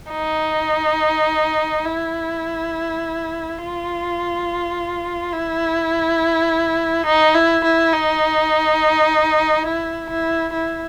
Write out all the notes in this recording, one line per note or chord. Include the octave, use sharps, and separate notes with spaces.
D#4
E4
F4
E4
D#4
E4
E4
D#4
E4
E4
E4